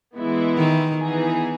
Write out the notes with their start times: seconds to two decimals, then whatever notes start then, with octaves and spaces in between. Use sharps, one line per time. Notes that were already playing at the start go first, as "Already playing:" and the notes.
0.16 E3 G#3 B3 E4
0.57 D#3
0.97 E3 B3 D#4 G#4